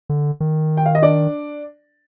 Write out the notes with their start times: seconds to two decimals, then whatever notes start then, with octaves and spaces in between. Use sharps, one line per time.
0.09 D3
0.40 D#3
0.77 G5
0.86 F5
0.95 D#5
1.02 D4 D5